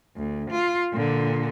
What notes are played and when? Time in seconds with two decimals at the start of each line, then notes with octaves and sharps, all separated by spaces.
0.17 D2
0.51 F4
0.93 A#2 D3